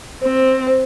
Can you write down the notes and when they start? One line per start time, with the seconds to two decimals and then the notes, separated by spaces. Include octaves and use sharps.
0.22 C4 C5
0.67 C5